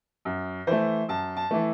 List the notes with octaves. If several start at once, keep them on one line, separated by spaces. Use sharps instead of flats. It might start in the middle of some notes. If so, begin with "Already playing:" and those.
F#2
E3 A3 C5
F#2 A5
A5
E3 A3